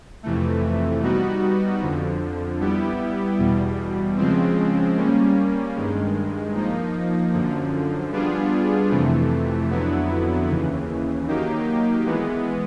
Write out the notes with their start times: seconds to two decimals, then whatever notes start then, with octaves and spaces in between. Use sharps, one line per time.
0.23 F2 C3 E3 A3
1.02 G3 B3 D#4 F#4
1.81 F2 D3 F3
2.60 G3 B3 E4 G4
3.39 E2 B2 G3
4.17 C#3 F3 G#3 C4
4.97 G3 A#3 C#4
5.75 G2 D#3 G#3
6.54 F3 A#3 D#4
7.33 F#2 D3 F3
8.12 G3 B3 D4 F4 G#4
8.91 F2 C3 E3 A3
9.70 F2 D3 F#3 B3 E4
10.48 D#2 C#3 E3
11.27 D#3 F#3 A#3 D#4 G4
12.06 E3 G#3 B3